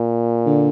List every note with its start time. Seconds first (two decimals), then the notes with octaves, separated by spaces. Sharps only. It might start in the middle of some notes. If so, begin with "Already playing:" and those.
Already playing: A#2
0.46 D3